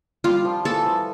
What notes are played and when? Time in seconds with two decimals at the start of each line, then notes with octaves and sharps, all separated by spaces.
0.24 G3 F4
0.45 F3
0.65 E3 A4
0.86 F3